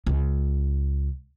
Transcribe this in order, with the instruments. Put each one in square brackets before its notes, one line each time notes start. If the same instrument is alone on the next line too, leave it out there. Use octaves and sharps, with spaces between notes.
[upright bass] C#2